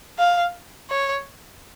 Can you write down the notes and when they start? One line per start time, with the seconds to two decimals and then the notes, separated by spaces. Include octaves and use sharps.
0.19 F5
0.90 C#5